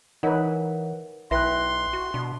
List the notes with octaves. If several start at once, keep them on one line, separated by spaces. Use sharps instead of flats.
E3 D#4 A#4 B4 C#5 F#5
B1 E4 B4 E5 G5 C6 F#6
F#4
B2 D4